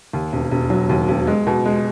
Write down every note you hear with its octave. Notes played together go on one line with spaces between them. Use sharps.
D#2
E1
E1
F#3
D#2
E1
G#3
B2
G#3